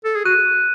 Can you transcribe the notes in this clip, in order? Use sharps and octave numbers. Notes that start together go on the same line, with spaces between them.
A4
G#4
F#4 F#6 D#7